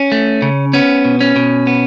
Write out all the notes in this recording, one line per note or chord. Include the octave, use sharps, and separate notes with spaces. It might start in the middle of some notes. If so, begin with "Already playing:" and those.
Already playing: C#4
A3
C#3
B3 C#4
B2
C#4
B2
B3